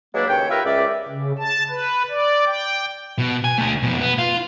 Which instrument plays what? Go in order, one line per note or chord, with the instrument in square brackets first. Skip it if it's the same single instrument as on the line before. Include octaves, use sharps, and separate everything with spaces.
[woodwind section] F#3 G#3 A#3 D4 E4 B4
D#2 C#3 C#5 G5
F4 G4 A#4 B4 E5 G5
C#2 D5 E5
[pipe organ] C#3
A5
B4
D5
G5
[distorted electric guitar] B2
G#5
D3 A3
F2 B2
B3
F4